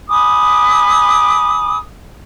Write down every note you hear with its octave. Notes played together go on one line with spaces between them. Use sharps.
G#5 B5 D6 D#6